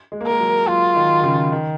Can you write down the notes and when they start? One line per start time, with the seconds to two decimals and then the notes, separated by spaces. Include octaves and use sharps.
0.12 G#3
0.21 A#3
0.27 G#3 A#4
0.40 F#3
0.67 F#3 F4
0.96 D#3
1.20 D#3
1.23 C#3
1.52 D#3